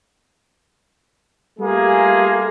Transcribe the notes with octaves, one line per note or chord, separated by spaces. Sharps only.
G3 A3 A#3 F4 G#4